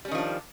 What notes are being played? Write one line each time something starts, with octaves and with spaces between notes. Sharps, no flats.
D#3 F3 G3 C#4 D4